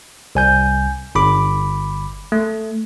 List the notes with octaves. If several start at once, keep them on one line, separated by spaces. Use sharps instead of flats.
C2 G#5 G6
G1 B5 D6
A3